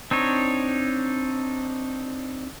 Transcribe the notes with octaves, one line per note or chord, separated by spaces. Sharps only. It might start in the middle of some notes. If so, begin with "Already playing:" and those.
C4 D4 D#4 C#5